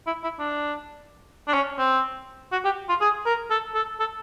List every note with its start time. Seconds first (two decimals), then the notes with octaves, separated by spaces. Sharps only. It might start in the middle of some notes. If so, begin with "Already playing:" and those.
0.07 E4
0.23 E4
0.39 D4
1.48 D4
1.54 C#4
1.78 C4
2.52 F#4
2.65 G4
2.89 F4
3.01 G#4
3.26 A#4
3.50 A4
3.75 A4
4.00 A4